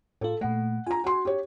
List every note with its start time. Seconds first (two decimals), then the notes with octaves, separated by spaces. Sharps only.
0.21 A2 F4 A4
0.41 A#2 A3 F#5
0.86 F4 G#5 A#5
1.04 F#4 C6
1.25 G4 C#5